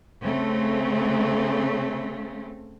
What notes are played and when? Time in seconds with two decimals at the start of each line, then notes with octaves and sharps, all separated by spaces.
0.22 C#3 A3 C4